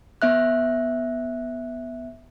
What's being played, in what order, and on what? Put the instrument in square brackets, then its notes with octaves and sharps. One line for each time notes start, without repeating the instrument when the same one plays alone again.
[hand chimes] B3 E5 F#6